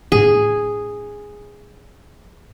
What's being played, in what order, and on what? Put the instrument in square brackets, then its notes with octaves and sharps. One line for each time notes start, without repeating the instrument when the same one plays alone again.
[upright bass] A2 D4 [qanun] G#4